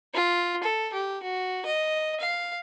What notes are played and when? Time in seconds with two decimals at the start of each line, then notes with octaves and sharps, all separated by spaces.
0.14 F4
0.63 A4
0.93 G4
1.23 F#4
1.65 D#5
2.20 F5